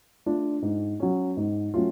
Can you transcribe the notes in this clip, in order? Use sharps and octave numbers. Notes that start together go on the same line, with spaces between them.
A3 D4 F4
G#2
F#3 C#4
G#2
F#3 A3 C#4 F4